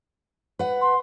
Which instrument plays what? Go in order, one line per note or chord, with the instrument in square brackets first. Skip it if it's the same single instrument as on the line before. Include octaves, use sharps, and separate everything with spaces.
[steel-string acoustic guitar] B4 F#5
[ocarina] C6